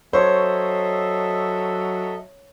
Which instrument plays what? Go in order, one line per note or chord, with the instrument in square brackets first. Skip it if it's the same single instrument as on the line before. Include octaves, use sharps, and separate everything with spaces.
[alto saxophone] F#3 [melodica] A4 D#5 E5 [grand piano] C5 C#6 [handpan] C#5